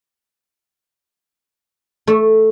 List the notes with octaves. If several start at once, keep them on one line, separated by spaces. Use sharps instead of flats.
A3